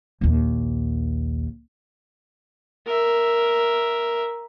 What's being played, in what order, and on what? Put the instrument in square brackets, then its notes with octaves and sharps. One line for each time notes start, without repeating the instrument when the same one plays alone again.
[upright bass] A#1 D#2
[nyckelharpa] A#4 E5